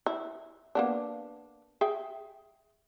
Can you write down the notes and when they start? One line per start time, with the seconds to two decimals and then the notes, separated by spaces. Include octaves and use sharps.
0.06 E4
0.75 A#3 B3 D4
1.81 G#4 E5 G5